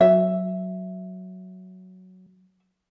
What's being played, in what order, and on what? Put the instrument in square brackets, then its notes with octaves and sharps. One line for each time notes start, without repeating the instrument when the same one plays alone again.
[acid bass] F#3 [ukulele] E5